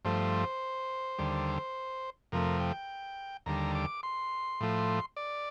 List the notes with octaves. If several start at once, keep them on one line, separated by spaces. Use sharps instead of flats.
G2 F3 A3 C5
D#2 D3 G3
F2 C3 F3 A3 A#4
G5
D#2 D3 G3 A#5
D6
C6
A2 F3 A3
D5